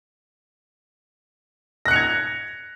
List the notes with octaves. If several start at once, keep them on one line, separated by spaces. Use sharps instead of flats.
F#6 G#6 A#6 C#7 F7